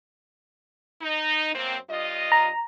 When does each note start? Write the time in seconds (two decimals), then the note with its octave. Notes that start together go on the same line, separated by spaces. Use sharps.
1.02 D#4
1.54 F#2 A#3 C4
1.89 G2 F4 D#5
2.32 A#5